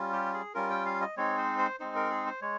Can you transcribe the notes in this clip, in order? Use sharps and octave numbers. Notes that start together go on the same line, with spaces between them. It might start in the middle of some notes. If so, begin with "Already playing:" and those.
Already playing: G3 C#4 F4
G4
G#4
G3 C#4 F4 A#4
G5
F5
D#5
G#3 C4 D#4 C#5
C5
C5
G#3 C4 D#4 C5
A#4
G#4
C5
G#3 C#5